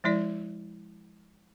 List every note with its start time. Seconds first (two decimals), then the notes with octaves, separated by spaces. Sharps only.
0.04 F3 G#3 E4 D5